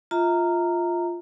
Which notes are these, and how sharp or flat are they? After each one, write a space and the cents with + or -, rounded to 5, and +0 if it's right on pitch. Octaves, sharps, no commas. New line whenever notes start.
F4 +0 E5 -35 A#5 -15